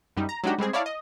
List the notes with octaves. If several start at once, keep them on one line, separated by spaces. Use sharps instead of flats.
F#2 G3 D#4
A#5
F#3 G#3 D4 D#4 F#4 G4
G3 G#3 C4 G#4
E4 C#5 D5 F5 A5
D#5